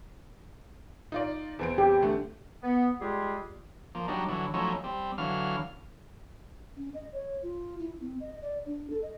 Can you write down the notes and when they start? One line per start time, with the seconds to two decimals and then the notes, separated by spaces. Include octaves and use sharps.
1.12 D#4 F4 D5
1.59 E2 C4 D7
1.78 G4
2.02 D3 A3
2.63 B3
3.01 G3 G#3 F4 G4 G#4
3.95 F3 A#3
4.08 F#3 G3 D4 D#4
4.29 D3 E3 F#3
4.54 F3 F#3 A3 C#4 D#4 E4
4.84 G3 C4
5.18 D3 E3 F#3 F5 F6
6.77 C#4
6.94 D#5
7.12 C#5
7.43 F4
7.80 E4
8.01 C4
8.20 D#5
8.42 D5
8.66 D4
8.90 A4
9.02 D#5